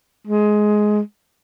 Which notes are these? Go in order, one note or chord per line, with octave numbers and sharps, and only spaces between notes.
G#3